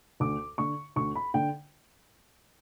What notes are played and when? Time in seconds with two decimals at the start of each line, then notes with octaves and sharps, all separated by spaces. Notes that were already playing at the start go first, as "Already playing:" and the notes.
0.20 D2 D6
0.58 D3 C#6
0.96 D2 C#6
1.15 B5
1.34 D3 G5